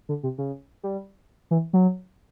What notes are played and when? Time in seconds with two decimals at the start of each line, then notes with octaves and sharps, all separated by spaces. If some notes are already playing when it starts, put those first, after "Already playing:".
0.09 D3
0.23 C3
0.38 C#3
0.83 G3
1.51 E3
1.73 F#3